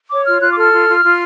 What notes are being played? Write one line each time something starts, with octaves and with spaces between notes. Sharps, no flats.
C#5 D6
F4 F6
F4 F#6
D6
A4 F6
F4
F4
F4